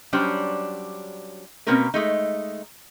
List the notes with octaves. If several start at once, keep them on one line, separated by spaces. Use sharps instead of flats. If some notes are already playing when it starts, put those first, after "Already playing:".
F#3 G3 C#4 D4 C5
B2 A#3 C4 C#4 A#4 B4
G#3 A3 D#4